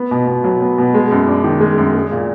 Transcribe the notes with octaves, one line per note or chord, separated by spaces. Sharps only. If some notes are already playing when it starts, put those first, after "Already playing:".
Already playing: B3
B2
B2
F#3
B3
B2
G#3
F#2
D4
D#3
G#3
F#2
G#3
A#2